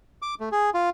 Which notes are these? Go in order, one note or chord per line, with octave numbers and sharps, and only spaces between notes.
D6
A3
G#4
F4